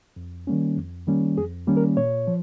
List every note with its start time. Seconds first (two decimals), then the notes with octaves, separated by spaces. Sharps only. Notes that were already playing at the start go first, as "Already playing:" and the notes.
0.16 F2
0.47 D#3 G3 A#3 C#4
0.77 F2
1.07 D#3 G3 A#3 C#4
1.37 F2 G#4
1.67 D#3 G3 A#3 C#4
1.77 A#4
1.97 A#2 C#5
2.27 F3